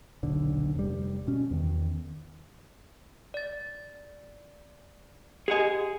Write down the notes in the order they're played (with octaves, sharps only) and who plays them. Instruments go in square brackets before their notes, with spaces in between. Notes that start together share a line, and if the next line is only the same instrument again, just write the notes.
[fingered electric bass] D#1 B1 D3
F1 G3
B2 C#4
E2 D#3
[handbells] D5 A6
[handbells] G4 D#5 [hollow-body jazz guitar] G#4 F#5 G#5